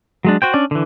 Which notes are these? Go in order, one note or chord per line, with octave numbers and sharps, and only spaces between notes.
F#3 G#3 D4
F#4 C5 G5
C#4 D4 D5
D3 E3